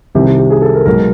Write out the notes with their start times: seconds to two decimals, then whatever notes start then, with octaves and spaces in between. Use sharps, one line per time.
0.15 C2 C3 D#3 G4
0.26 G4
0.38 G4
0.50 G#4
0.62 A4
0.74 A#4
0.86 B1 B2 G#3 A#4